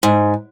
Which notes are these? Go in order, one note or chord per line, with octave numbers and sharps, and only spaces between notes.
G#2